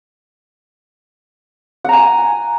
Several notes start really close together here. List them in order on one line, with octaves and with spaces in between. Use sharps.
F#5 A#5 G#5